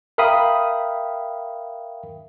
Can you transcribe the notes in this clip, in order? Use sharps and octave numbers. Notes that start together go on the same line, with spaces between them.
A#4 E5 F5 G5 B5 D#6